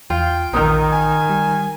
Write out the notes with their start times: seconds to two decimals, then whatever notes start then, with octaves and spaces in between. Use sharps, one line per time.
0.10 E2 F4 G5
0.53 A#1 D#3 D#4 A#4
0.92 G#5
1.30 G3